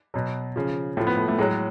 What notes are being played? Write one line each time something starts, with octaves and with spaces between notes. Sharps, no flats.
B2 F#3
C#3 F3
A2 F3 A3
B3
A3
A3
A2 F#3 G#3